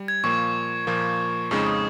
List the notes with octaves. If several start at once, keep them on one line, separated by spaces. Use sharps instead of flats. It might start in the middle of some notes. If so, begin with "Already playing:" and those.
Already playing: G3
G#6
A#2 F3 A#3 C#6
A#2 F3 A#3
F2 C#3 G#3 D#4 C#6
D#6